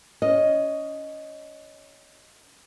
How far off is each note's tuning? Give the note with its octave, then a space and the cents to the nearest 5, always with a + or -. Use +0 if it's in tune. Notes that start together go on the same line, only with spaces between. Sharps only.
C#4 +20 D#5 +0